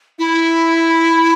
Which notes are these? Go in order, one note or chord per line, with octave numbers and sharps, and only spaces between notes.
E4